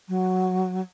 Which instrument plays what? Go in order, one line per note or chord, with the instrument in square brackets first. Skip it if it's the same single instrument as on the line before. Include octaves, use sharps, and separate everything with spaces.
[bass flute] F#3